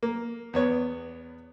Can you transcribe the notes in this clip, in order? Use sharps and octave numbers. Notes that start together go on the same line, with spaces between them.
A#3
E2 B3 C#5